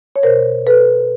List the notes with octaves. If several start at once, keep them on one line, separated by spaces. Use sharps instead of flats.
C#5
B2 A#4 C5
A4 B4